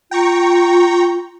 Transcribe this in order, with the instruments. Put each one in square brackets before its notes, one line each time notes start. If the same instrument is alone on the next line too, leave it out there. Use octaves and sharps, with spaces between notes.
[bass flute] F4 [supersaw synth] G5 A#5 C#6